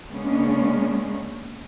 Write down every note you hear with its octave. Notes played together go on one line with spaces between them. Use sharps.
C#3 G#3 A#3 B3 C#4 D4